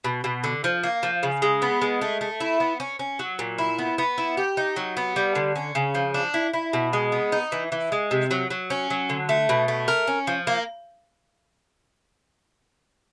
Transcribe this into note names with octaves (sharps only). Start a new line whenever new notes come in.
B2
B2
D3
F3
A#3
F3
C#3
G#3
B3
G#3
A3
A3
E4
B3
C#4
C#4
F#3
A#2
E4
B3
B3
E4
G4
D#4
F#3
B3
G3
D3
C#4
C#3
F3
D4
E4
E4
B2
G#3
B3
D#4
E3
E3
G#3
C3
F#3
F#3
C#4
F#3
D3
A3
B2
A3
A#4
C#4
F3
A#3